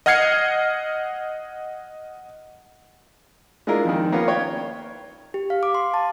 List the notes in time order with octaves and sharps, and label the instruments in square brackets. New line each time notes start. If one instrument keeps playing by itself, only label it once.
[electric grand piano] D#5 F#5 F6 G#6 C7 C#7
[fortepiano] G#3 D4 E4 F4 A#4
F2 D#3
A#3 B3 C#4 F4
C#5 G5
[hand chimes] G4
F5
D6
C6
A5